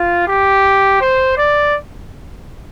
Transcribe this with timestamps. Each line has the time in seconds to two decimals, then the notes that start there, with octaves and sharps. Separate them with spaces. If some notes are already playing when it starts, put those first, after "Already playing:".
Already playing: F4
0.27 G4
1.01 C5
1.37 D5